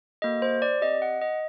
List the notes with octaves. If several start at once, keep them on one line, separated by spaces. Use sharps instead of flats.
A#3 F#4 A4 D#5
C5
D5
C4 G4 D#5
F#5
D#5